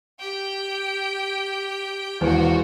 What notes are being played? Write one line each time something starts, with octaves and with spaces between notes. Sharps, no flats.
G4 G5
E1 E2 F4 F#4 C5